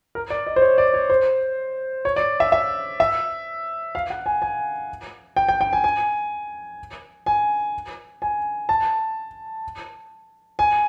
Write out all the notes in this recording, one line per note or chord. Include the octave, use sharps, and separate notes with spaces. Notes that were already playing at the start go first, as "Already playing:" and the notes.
A#4
D5
D#5
C5
C#5
D5
C#5
C5
C#5
D5
E5
E5
E5
F5
F#5
G#5
G#5
G5
G5
G5
G#5
G#5
G#5
G#5
A5
G#5